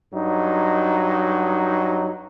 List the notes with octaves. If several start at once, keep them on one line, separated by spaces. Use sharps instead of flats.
G2 F#3 D#4